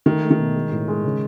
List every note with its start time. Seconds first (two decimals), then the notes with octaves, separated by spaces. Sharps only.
0.06 D#3 A3
0.22 A3
0.31 D#3
0.39 B2
0.55 G#3
0.71 A2
0.88 G#3
1.05 C#3